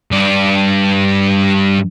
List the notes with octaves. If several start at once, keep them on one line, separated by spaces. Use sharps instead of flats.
G2 D5